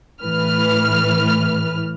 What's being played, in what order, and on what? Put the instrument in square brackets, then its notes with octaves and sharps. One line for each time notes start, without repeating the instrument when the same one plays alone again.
[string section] A2 E3 B4 F6